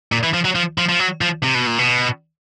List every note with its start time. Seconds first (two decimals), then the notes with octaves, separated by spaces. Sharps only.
0.12 A#2
0.23 E3
0.34 F3
0.45 F#3
0.55 F3
0.78 F3
0.89 F3
1.00 F#3
1.21 F3
1.43 C3
1.55 B2
1.67 A#2
1.79 B2